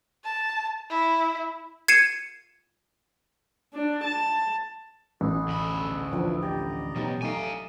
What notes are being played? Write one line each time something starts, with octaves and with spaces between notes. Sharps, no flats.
A5
E4
G#6 C7 C#7 D#7 E7
D4
A5
A1 F#4 G#4 A4
D2 B5
E3 F3 D4
G4 D5 D#5 A#5
B2 F#3 D#4 G4
A3 D#4 F5 G#5